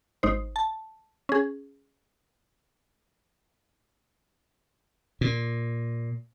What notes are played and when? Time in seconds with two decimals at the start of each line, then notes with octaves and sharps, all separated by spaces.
0.23 G#1 D#4 C5
0.56 A5
1.29 C#4 G#4
5.21 A#2